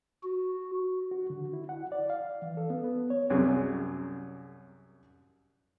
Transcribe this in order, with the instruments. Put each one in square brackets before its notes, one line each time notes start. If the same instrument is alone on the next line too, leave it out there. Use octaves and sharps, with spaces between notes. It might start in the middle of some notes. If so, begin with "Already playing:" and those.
[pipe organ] F#4
[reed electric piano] F#4
D3
E4
F#5
D5
F5
E3
A4
B3
B3
C#5
[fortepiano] C2 F#2 G#4